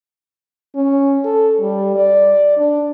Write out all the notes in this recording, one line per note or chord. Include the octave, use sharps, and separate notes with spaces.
C#4
A4
G3
D5
D4